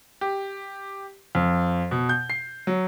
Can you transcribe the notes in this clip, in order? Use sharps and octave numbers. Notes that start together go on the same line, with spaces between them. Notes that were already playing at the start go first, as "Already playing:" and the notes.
G4
F2
B2
G6
C7
F#3